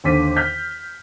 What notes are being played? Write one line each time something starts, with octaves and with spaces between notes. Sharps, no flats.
D#2 D3 C5 D6 B6 D#7
F6 G6 B6